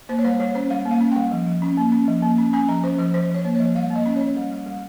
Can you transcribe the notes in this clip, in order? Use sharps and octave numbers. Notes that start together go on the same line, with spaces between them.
A#3 C5
C#5
G3 C5
G3 C#5
C#4 C5
G3 F5
A#3
F5
C#4
G3 G5
F3
F3
C#4
A#3
C#4
F3
A#3
C#4
C#4 G#5
F3 A#5
C#4 C5
F3 C5
F3 C5
F3 C#5
A#3
C#5
F3
G3 F5
A#3
D#5
C#4
C#4 C#5
G3
G3
G3